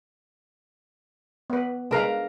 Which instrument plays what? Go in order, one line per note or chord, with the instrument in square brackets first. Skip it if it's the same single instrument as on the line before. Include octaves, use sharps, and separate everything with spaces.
[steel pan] B3 B4
[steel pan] G#3 B4 [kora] D4 A#4 F5